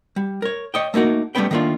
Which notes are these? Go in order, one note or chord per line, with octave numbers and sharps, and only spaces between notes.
G3
A#4 C#5
C#5 D#5 G5
A3 A#3 D#4 F#4 A#4
G3 A3 B3 C#4 B4 G5
D#3 A3 A#3 D4 F4